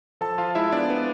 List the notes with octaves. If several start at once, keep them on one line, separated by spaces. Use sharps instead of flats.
F3 A4 A5
F3 F4 F5
G#3 E4 E5
B3 D4 D5
B3